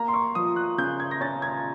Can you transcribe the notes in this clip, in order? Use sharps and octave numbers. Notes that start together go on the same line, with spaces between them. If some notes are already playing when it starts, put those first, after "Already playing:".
Already playing: A#3 A#5
C6
C#6
F3 D#6
F#6
C#3 G6
G#6
A#6
C#4 A6
G#6